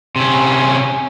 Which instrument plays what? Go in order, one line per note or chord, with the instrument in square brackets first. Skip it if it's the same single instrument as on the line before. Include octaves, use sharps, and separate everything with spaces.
[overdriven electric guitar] C3 C#4